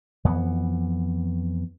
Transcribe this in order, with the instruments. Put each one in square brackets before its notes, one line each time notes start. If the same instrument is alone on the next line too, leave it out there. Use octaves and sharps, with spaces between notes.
[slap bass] F2 E3 B3